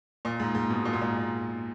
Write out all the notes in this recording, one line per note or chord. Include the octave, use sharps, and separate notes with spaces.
A#2
G#2
G#2
B2
A#2
G#2
A#2